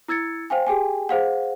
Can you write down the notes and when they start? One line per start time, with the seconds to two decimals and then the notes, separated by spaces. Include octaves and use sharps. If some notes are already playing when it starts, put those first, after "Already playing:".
0.08 E4 E6 G#6 A6 C#7
0.50 C5 F5 G5 G#5
0.67 G4 G#4 G5 G#5
1.09 G#4 C5 F5 F#5